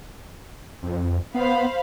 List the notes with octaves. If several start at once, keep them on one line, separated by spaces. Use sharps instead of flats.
F2
B3 C5 F5 B5